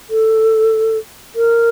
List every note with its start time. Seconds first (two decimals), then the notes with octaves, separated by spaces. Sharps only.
0.10 A4
1.36 A#4